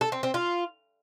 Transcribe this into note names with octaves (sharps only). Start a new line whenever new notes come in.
A4
C4
C4
F4